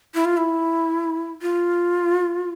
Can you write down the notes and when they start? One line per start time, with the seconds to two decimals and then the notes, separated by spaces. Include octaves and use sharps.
0.14 E4
0.25 F4
0.37 E4
1.42 F4